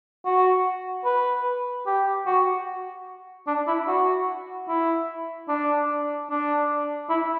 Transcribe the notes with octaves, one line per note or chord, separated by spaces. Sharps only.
F#4
B4
G4
F#4
D4
E4
F#4
E4
D4
D4
E4